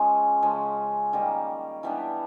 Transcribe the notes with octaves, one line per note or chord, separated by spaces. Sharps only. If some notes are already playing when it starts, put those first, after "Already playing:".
Already playing: F3 G#3 C#4
C#3 F3 G#3 C#4
D#3 G3 A#3
E3 G3 B3 D4